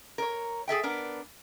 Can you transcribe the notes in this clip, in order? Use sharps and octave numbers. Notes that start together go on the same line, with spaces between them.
A#4 C#5
G#4 A4 E5 G5
B3 D4 A#4